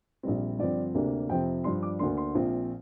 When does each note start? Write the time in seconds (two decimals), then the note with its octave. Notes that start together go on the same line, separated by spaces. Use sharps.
0.23 A#1 A#2 G3 C4
0.59 G2 D3 F3 C4 D5
0.94 D2 C3 A#3 D4
1.29 F2 C3 F3 C4 G5
1.64 G2 F3 D4 C6
1.83 D6
1.99 D2 D3 A#3 D4 C6
2.17 C6
2.35 A#1 A#2 F3 C4